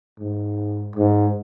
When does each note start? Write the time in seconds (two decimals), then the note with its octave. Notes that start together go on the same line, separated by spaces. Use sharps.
0.19 G#2
0.95 G#2